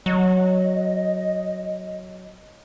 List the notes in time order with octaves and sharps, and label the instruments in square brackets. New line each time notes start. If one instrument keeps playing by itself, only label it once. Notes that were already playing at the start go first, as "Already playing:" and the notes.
[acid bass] F#3 [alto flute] D#5